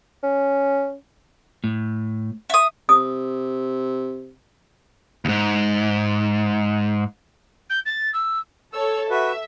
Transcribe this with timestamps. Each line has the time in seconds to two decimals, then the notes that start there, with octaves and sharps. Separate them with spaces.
0.23 C#4
1.64 A2
2.50 E5 D#6
2.89 C3 D#6
5.25 D#2 G#2
7.69 G6
7.85 A6
8.13 E6
8.73 A4 C#5 E6
9.10 F#4 B4 E5